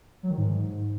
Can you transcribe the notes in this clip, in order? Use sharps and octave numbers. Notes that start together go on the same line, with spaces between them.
F#3
D#3
G#2